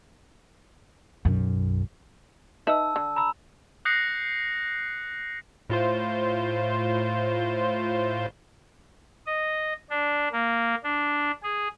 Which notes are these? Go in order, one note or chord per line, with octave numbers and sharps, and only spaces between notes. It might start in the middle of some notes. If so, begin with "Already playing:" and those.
B1 F#2
D#4 B4 E5 A5 E6
D3
A#5 B5 E6
D#6 F#6 G6 A#6 C7 C#7
A2 F4 C5
D#5
D4
A#3
D4
G#4